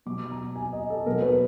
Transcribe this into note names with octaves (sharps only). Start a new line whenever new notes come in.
B2 F#3 D6
A#5
G#5
D#5
A4
B2 F#3 A#4
B4